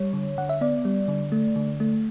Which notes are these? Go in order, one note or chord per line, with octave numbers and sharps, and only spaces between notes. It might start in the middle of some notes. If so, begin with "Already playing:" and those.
Already playing: G3 C#5
D3
D3 F#5
E5
B3 D5
G3
D3
A3
D3
A3